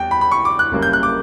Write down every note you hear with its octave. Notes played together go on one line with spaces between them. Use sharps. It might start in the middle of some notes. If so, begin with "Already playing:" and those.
Already playing: E2 G3 G5
B5
B5
C#6
D6
F#6
F#1 F#2 C#3 G3 A#3
G6
F#6
D6